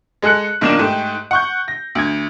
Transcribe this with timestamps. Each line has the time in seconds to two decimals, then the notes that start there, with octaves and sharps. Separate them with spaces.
0.22 G#3 G#4 A4 F#6 C#7
0.61 B1 D#3 A#3 D4 F4 E7
0.79 G#2 A3 G4
1.31 F#5 C#6 G6
1.68 A#6
1.95 D2 G#6